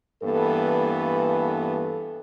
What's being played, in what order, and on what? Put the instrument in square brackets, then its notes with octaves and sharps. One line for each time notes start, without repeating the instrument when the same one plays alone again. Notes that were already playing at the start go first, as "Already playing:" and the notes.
[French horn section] G2 E3 A#3 B3 A4